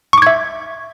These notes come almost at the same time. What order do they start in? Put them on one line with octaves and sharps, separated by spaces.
C#6 D6 G#6 E5